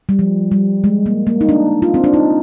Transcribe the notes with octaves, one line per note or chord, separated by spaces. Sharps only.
G3
F3
G3
G#3
A#3
A#3
D#4
D4
F4
C4
D4
D#4